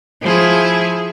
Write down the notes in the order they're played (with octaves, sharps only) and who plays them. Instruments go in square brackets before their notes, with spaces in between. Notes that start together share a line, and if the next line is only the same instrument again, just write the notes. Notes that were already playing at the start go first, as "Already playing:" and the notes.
[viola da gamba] F3 E4 G#4